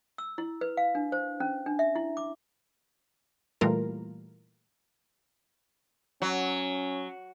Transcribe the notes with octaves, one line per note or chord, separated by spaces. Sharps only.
E6
E4
B4
F5
D4
C5
C#4
D4
E5
E4
D6
A#2 E3 G3 A3 F4 A#4
F#3 C#4